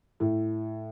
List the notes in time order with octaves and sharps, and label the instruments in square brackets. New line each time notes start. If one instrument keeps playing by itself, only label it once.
[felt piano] A2